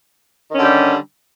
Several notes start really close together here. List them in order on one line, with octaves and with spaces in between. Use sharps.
D#3 C#4 D3 G4 G3